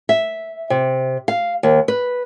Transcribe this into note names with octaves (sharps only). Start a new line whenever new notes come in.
E5
C3
F5
D#2
B4